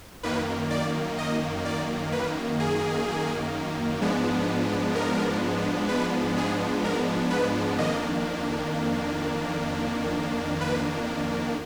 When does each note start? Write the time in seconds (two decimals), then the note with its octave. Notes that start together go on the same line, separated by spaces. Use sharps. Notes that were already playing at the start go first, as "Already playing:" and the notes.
0.23 F#2 D#3 A#3 B4
0.70 D5
1.18 D#5
1.65 D5
2.12 B4
2.60 G#4
4.01 G#2 F3 G#3 B3 D4
4.95 A#4
5.89 B4
6.37 G#4
6.84 A#4
7.30 B4
7.78 F2 D#3 A#3 D4 D#5
10.61 B4